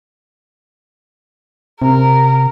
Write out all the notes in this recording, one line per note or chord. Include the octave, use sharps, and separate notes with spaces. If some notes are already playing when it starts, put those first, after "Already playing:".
C3 A#4